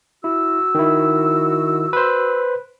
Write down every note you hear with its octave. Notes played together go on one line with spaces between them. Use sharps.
E4 F#4 E6
D#3 E4
B4 C5